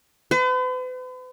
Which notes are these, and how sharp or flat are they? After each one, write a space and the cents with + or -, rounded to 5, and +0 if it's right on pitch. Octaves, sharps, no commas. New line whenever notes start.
B4 +45